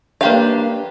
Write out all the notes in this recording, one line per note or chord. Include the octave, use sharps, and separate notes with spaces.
A#3 D4 G4 B4 F5